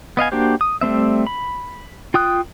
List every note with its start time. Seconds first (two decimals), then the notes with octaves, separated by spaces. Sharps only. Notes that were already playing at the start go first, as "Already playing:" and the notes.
0.17 B3 D#5 F5 G#5
0.32 A#3 D4 F#4 G4 C5
0.61 D#6
0.81 G3 A3 C4 E5
1.27 B5
2.14 F4 G5 D#6 F#6